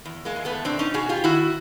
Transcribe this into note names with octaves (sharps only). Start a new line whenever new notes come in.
E2
G#3 A#3
E2
A3 B3
B2 C4 D4
C#4 D#4
B2 F#4 G#4
F4 G4
D#3 E4 F#4